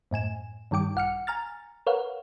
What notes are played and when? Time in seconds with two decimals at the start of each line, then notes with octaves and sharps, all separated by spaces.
0.11 F#2 A2 G#5 E7
0.71 G2 D#3 G3 G5 D6
0.95 A#1 F#5 F6 C#7
1.27 G#5 A#5 F6 A6
1.87 A#4 B4 C#5 F5 F#5